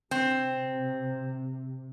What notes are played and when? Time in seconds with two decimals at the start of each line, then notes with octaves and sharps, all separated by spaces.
0.11 C3 C4